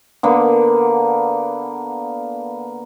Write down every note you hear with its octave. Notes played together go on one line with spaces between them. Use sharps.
D3 A#3 B3